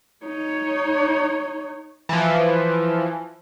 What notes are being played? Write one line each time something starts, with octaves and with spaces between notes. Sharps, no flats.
D#4 C#5
E3 F3